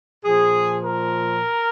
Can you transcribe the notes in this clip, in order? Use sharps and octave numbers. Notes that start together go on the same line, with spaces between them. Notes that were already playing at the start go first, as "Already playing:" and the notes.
A#2 F3 G#4
A#4